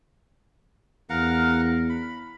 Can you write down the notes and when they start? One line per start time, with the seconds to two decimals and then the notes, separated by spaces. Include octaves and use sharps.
1.10 E2 A#4 F5 F#5
1.90 B5